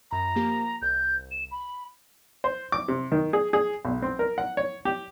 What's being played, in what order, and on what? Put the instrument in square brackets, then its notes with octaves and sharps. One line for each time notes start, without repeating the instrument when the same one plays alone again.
[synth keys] F#2 B5 [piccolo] A#5
[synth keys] F3 A#3 G4
[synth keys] C2 [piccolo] G6
[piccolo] E7
B5
[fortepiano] C5
D6
C3
D#3
G#4
G#4
B1
C4
A#4
F#5
C#5
G4